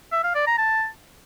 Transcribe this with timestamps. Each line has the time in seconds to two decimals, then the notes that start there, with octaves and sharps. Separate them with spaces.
0.12 E5
0.24 F5
0.35 D5
0.47 A#5
0.58 A5